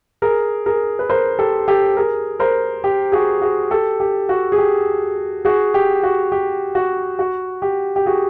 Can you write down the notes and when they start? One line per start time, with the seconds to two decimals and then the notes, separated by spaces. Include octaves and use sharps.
0.22 G#4 A#4
0.66 G#4 A#4
0.99 B4
1.09 A#4 C5
1.39 G4 A4
1.68 G4 A4
1.97 G#4 A#4
2.40 A#4 C5
2.84 G4
3.12 F#4 G#4
3.41 F#4 G#4
3.71 G4 A4
4.00 G4
4.29 F#4
4.52 G#4
4.58 G4
5.45 F#4 G#4
5.74 G4
6.03 F#4
6.32 G4
6.75 F#4
7.19 F#4
7.62 G4
7.96 G4
8.06 F#4 G#4